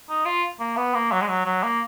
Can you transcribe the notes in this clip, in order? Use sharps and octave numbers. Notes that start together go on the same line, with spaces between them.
D#4
F4
A#3
B3
A#3
F#3
G#3
F#3
F#3
A#3